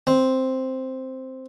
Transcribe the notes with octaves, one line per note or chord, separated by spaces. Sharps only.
C4